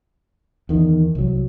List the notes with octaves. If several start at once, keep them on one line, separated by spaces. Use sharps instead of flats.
E2 D#3
C2 F#3